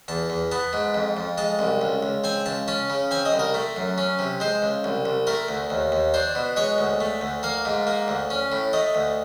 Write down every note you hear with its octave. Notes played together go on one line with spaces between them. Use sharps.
E2 A5
E2
B3 A5
G#2
F2
F2
G#3 A5
C2
C#2
C#2
C4 G#5
C#2 A5
C#4 A5
C#3
C4 G#5
D#5
C2
A#4
A3
F#2
C#4
C3
G#3 C5
C#2
C2
C2
A3 A#4
D2
D#2
D#2
D4 C5
B2
G#3 C#5
D2
A3
D2
A#3 F5
G#2
A#3
D2
C#4
A2
A3 D#5
D2